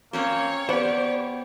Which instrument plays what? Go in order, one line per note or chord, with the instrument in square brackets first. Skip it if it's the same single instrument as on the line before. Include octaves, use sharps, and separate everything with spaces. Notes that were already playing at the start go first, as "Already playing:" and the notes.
[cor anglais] A#3 [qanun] C4 C#4 C5 [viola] C#5
[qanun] B3 G4 [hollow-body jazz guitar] C5 F#5 [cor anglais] D5